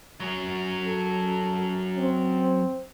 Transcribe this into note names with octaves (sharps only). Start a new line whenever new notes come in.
F#2 F#3
A4
C4